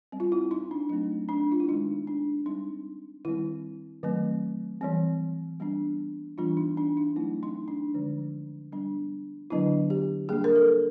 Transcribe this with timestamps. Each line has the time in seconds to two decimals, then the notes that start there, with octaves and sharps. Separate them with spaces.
0.12 G3 C4
0.20 F4
0.32 E4
0.51 D#4
0.71 D4
0.89 F#3 A3 C4 D#4
1.29 D4
1.52 F4
1.60 E4
1.68 D#3 G#3 B3 D4 D#4
2.07 D4
2.46 G3 C4 D#4
3.25 D#3 G3 C4 E4
4.03 D#3 F#3 A3 C4
4.81 E3 G3 C4
5.60 G3 B3 D4
6.38 E3 G3 B3 D4 F4
6.57 D#4
6.77 D4
6.97 D#4
7.16 F#3 A3 C4 E4
7.43 D#4
7.68 D4
7.94 D3 F3 G#3
8.72 G3 B3 D4
9.50 D3 F#3 B3 D4 E4
9.90 G4
10.29 G3 A#3 D4 G#4
10.44 A#4
10.56 A4